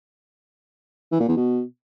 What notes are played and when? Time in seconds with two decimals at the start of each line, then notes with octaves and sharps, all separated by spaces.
1.12 E3
1.20 A#2
1.28 E2
1.36 B2